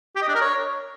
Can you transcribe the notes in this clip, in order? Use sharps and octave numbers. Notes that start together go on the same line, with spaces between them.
G4
D#5
D4
A#4
C#5